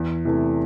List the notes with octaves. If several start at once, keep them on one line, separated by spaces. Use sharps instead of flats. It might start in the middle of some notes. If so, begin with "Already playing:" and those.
Already playing: E2
C3 E3 A3